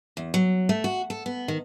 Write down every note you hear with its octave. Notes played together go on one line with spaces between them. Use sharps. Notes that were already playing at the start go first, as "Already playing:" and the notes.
E2
F#3
A3
F#4
A4
B3
D#3